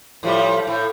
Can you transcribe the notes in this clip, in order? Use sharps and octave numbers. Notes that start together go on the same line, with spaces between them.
A2 F3 G3
A2